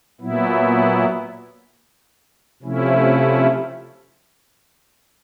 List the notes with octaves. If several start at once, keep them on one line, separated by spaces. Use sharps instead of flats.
A#2 F#3 B3 E4
C3 F3 A3 C#4 E4